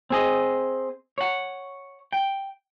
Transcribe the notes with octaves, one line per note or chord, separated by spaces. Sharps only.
C4 G#4 D#5
C#5 F#5
G5